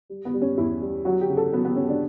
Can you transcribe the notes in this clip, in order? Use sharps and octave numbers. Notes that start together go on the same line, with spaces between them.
G3
B3
G3
C#4
E2 E4
G3
F#3 F#4
G4
C#3
A4
F#3 B3
B3
F#3 C#4
D4